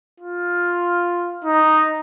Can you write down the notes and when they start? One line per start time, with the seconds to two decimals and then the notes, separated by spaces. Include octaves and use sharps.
0.20 F4
1.45 D#4